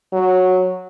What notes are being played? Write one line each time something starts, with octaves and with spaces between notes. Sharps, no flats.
F#3